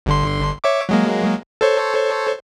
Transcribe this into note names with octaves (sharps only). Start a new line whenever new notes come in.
G1 D3 C6
C#5 E5 D6
F#3 G#3 A#3
A4 C5 C#5